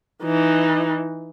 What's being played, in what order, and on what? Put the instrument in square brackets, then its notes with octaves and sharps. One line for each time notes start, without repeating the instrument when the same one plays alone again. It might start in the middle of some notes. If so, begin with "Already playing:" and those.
[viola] E3 D#4